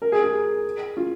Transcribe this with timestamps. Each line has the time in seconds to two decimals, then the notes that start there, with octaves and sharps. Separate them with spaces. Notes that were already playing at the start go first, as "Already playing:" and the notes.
0.02 A#4
0.12 G#4
0.23 G#4
0.97 F4